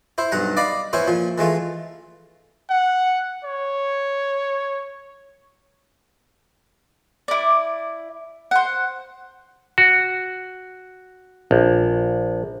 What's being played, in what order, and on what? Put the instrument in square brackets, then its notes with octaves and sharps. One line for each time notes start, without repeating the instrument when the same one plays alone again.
[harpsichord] E4 C5
B1 G2 F#5 A#5
D5 D#5 F5 B5
B3 C#4 E4 C5 C#5
A#2 F3
E3 G#3 A3 F4
[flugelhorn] F#5
C#5
[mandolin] E4 D5
C5 F#5
[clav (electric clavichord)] F#4
A#1